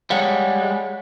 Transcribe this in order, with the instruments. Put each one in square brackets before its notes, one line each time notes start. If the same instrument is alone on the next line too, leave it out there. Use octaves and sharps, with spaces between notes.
[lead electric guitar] G3 G#3 [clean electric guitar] C#5 F5 F#5